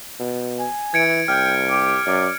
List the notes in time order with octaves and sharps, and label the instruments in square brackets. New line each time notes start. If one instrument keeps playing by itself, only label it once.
[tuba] B2
[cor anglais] G#5
[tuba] E3 [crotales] G#6 C#7 D7
[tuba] C2 [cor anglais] G5 [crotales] F6
[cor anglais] G4
[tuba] F#2 [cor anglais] D5